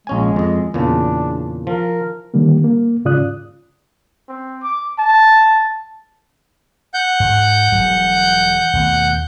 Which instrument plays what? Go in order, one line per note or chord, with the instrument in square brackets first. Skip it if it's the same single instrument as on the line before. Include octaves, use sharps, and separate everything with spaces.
[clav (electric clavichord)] A#1 C#4 G#5 [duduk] G#3
[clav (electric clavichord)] F2 D#5
[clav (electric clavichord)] E2 A#2 C#3 [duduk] D4
[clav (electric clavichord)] F3 [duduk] A#4
[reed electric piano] D3 D#3 G3 A#3
A#3
G#2 C#3 F4 D5 D#6 F#6
[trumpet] C4
D6
A5
[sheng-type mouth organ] F#5 G6
[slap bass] G#2
E1 F#3 G3
D#2 B2 A3